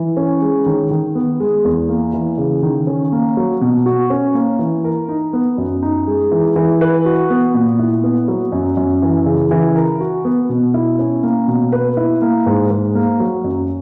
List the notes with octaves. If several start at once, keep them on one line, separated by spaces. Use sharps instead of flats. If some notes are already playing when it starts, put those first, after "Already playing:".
Already playing: E3
C#4
G#3
D#3
D#3
B3
G#3
E2
A#3
E3
C#3
D#3
C#4
A#3
F#3
B2
F#4
C#4
A#3
E3
A#4
D#4
B3
F#2
D#4
G#3
E3
E3
B4
F#4
B3
A#2
E4
B3
F#3
F#2
F#2
E3
C#3
E3
A#4
F#4
B3
B2
E4
C#4
A#3
B2
B4
E4
A#3
G#2
G#2
A#3
F#3
F#2